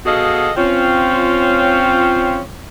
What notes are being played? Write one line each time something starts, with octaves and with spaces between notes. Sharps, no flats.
B2 F#4 G#4 A4 D#5 F5
C4 C#4 F4